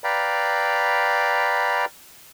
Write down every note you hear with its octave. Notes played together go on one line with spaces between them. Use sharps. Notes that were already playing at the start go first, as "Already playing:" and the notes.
B4 D5 F5 G5 A#5 B5